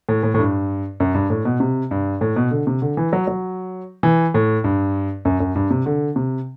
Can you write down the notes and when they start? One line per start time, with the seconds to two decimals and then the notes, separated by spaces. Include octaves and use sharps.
0.09 A2
0.23 A2
0.34 A2
0.39 G2
1.00 F#2
1.14 G2
1.30 A2
1.45 B2
1.60 C3
1.91 G2
2.21 A2
2.36 B2
2.51 D3
2.67 C3
2.82 D3
2.97 E3
3.13 F#3
3.27 F#3
4.03 E3
4.34 A2
4.64 G2
5.25 F#2
5.40 F#2
5.55 G2
5.71 C3
5.86 D3
6.16 C3